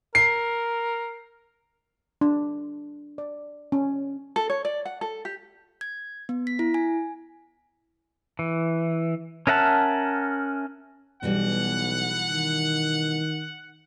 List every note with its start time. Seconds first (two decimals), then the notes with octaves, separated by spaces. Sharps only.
0.15 A#4 C7
2.21 D4
3.18 D5
3.72 C#4
4.36 A4
4.50 C#5
4.65 D5
4.85 F#5
5.01 A4
5.25 G4
5.81 G#6
6.29 B3
6.47 B6
6.59 E4
6.74 G#5
8.39 E3
9.47 C#4 A#4 E5 F#5 A5
11.23 B1 B2 E3 G3 F#5
12.31 D#3